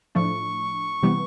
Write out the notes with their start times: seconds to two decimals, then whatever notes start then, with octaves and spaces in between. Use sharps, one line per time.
0.15 A2 F3 A3 D4 C#6
1.03 C3 E3 G3 B3